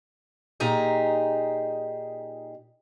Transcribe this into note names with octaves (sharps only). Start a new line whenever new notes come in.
A#2 D#4 G4 G#4